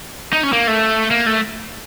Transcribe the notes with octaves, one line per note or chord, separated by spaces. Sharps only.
D#4
C#4
A#3
A3
A#3
A3